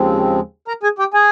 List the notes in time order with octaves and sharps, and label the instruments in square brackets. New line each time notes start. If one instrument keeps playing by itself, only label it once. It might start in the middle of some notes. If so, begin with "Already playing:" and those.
Already playing: [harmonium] D#2 C#3 F3 G#3 C4
A#4 A#5
G#4 G#5
G4 G5
G#4 G#5